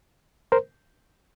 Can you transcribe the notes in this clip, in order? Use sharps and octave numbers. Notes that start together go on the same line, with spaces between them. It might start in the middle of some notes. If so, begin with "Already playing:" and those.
A#4 C5